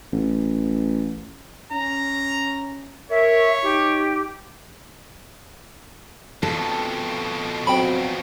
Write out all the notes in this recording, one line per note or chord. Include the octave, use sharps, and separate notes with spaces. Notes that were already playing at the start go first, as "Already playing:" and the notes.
A1
C#4 A#5
A#4 C#5 E5
D#4 G4
F2 B2 A4
F#3 C4 G5 B5